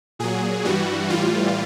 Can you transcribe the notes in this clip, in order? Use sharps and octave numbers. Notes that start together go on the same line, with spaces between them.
A#2 F#3 G#4
G2 E3 G3 F#4
A2 E3 G3 F4